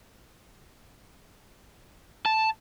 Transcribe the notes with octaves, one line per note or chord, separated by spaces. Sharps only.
A5